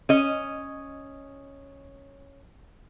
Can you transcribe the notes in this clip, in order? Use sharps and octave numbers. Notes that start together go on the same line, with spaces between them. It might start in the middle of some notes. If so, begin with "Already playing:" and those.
C#4 D#5